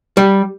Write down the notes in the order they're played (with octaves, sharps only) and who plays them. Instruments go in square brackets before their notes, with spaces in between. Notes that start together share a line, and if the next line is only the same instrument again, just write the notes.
[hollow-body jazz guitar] G3